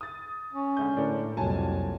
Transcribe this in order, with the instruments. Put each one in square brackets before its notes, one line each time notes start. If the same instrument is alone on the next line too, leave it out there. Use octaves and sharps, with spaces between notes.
[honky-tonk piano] D#6 A6
[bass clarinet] C#4
[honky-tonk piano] D3 G#3 G6
[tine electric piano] A2 [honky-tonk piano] D4 A4 A#4
[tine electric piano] C2 F#3 [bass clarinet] F2 [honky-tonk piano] A#2 G#5 A5